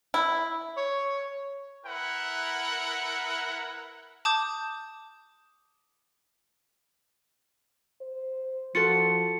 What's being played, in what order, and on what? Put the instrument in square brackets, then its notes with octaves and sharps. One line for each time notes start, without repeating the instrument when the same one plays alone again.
[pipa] E4
[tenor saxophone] C#5
[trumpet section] E4 A#4 B4 F#5
[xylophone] A5 D6 D#6 G6
[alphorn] C5
[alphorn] F3 [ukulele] F4 F#4 A4 [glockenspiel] C#7